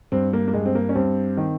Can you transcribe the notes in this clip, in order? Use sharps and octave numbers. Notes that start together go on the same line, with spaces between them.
G2 C4
A#3
A#3
G2 G#3
C4
A#3
C#4
G2 C4
D#3